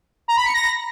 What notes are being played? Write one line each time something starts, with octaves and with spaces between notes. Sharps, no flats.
A#5
B5
C#7
A#6